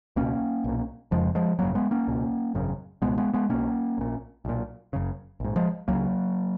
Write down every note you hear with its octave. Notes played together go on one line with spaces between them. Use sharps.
C#2 B2 A#3 C#4
B1 A#2
F1 F2 C#3 F3 G#3
F3 G#3
G#1 F#2 C#3 F#3 A#3
G#3 B3
A#3 C#4
C#2 B2
G#1 F#2 C#3
C#2 B2 G#3 B3
G#3 B3
G#3 B3
B1 B2 A#3 C#4
A#1 A#2
B1 A#2
F#1 F#2 C#3
A#1 G#2
F3 G#3
C#2 C#3 F#3 A#3